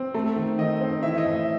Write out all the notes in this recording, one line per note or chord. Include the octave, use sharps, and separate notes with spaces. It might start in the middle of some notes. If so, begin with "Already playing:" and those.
Already playing: C4
A3
D#3
D#3 D#5
C4
E3 E5
D#5
A2
E5